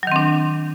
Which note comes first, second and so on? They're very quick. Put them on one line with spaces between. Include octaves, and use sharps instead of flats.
F#3 D#3 C4 D4